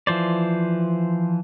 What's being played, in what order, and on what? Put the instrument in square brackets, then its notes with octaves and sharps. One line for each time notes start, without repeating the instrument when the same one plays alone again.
[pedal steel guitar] E3 F3 C5 D5